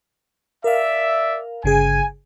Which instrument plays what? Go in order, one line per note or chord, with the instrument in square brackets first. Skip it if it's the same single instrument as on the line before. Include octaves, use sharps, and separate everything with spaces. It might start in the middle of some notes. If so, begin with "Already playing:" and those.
[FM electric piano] A#4 F5 [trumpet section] D5 E5
[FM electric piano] G1 C#3 G#4 [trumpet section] G#5